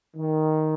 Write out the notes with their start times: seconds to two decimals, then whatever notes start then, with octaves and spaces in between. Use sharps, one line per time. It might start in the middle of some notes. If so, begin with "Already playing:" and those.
0.15 D#3